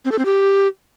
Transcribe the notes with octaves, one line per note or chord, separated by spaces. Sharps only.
C4
A4
C4
G4